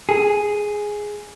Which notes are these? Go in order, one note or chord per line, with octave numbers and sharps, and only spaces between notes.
G#4